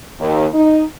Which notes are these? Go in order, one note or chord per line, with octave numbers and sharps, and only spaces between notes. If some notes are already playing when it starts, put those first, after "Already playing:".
D#2
D#4